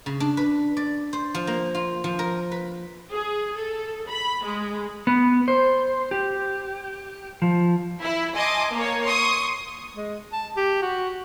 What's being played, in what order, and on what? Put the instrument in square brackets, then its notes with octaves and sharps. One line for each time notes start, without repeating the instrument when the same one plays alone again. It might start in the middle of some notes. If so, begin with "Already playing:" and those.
[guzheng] C#3
D4
B4
D5
C5
F3
A#3
F4
F3
A#4
B4
[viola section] G#4
A4
B5
G#3
[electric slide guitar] B3
C5
G4
F3
[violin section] E4
D#5 G#5 A5 C6 D6 D#6
A#3 C#5
C6 C#6 D#6
[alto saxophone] G#3
A5
G4
F#4